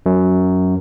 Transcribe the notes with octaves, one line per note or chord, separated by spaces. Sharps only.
F#2